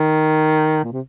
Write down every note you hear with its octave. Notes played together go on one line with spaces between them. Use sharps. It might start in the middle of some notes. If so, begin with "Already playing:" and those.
Already playing: D#3
A#2
C3